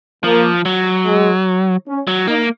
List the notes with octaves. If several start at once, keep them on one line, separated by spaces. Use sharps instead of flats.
F3 A#3
F#3
G#3
C#4
F#3
A#3 D#4